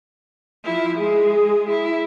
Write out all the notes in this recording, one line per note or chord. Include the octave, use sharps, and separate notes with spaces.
F3 E4
G#3 G#4
E4